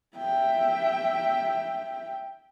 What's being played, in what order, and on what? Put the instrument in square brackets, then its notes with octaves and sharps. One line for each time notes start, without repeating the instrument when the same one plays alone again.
[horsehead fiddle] E5 G5